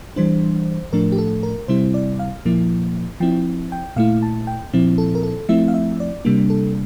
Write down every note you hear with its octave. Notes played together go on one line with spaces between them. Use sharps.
E3 G3 D4 C5
A2 F3 A3 D4 A#4
G4
A4
A#4
C3 G3 C4 E4 C5
D5
F5
A#2 F3 A#3 E4
F3 C4 E4 G5
G5
A#2 A3 E4 F5
A5
G5
A#2 F3 C4 E4
A4
A#4
A4
F3 A3 C4 E4 E5
F5
E5
D5
C3 G3 A#3 D4
A4